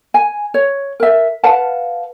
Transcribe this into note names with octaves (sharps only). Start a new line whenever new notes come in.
G#5
C#5
A#4 E5
B4 F5 F#5 A5